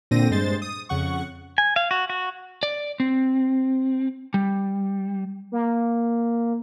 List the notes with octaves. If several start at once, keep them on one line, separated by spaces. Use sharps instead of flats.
A#2 D3 C4 A#6 D#7
G2 G#3 C5 A6
D#6
F2 C#3 F#5 C#6
G#5
F5
F#4
F#4
D5
C4
G3
A#3